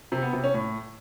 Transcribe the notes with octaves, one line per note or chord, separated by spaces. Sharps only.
C3
B3
C3
C#4
A2